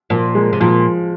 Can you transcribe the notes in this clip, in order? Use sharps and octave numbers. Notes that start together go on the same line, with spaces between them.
A#2 F3
G#3
C3
A#2 F3